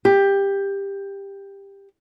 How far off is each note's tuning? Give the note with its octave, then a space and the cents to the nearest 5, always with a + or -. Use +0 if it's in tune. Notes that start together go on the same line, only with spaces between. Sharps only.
G4 +15